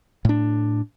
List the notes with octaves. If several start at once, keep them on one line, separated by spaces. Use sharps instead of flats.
A2 D4